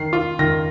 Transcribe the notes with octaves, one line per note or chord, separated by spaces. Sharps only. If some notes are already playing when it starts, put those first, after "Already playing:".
Already playing: D#3 C7
F4
D#3 A#6